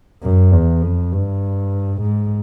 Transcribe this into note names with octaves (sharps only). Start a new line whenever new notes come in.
F#2
E2
F2
G2
G#2